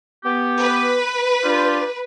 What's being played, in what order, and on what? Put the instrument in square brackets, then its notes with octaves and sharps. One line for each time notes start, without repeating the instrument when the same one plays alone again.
[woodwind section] B3 G4
[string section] B4
[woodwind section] D4 F4 G4